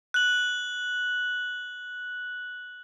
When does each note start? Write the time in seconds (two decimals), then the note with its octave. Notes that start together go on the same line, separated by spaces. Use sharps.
0.14 F#6 F#7